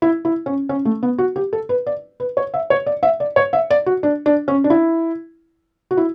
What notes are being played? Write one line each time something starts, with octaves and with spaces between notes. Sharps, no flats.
E4
E4
C#4
C#4
A3
B3
F#4
G4
A4
B4
D5
B4
C#5
E5
C#5
D5
E5
D5
C#5
E5
D5
F#4
D4
D4
C#4
D4
E4
F#4
E4